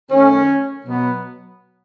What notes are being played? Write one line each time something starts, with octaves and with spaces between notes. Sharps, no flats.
F#2 D#3 A3 C#4
B2 F#3 B3